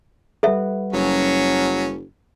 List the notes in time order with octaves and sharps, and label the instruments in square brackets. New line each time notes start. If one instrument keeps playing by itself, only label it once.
[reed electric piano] G3 B4 F#5 [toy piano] A4 E5
[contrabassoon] F#1 [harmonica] F#3 C#4